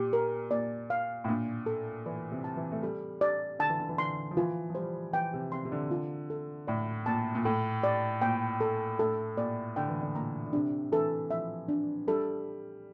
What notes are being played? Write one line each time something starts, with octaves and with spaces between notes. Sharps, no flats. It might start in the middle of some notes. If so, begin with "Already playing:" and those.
Already playing: A#2 G4
A#4
A#2 D5
F5
A2
A#2 D4
A4
E3 D5
C3
A5
E3
A3
G3 A4
D5
D3 A5
E3
D3
E3
D3 C6
F3
E3 F4
F3
G3 C5
E3 G5
C3
C3 C6
C3
D3
F4
A4
A2 D5
A#2 A5
A#2
A2 A4
D5
A#2 G5
A4
A2 A4
A#2 D5
D3 G5
E3
D3
A#2 A#5
D3
C3 D4
E3 A4
F3 E5
D4
G3 A4